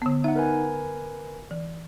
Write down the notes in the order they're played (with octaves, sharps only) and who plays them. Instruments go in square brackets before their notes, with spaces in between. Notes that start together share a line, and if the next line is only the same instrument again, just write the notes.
[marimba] D3 B3
[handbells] D#4 F#5 [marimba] E5
[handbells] A#4 B4 G#5
[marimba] E3